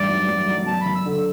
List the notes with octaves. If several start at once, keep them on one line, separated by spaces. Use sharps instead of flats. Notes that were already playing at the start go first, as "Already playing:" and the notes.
Already playing: A1 G2 D5
F#3
F#3
F#3
F#2 A5
B5
F#2
E6
D3
E6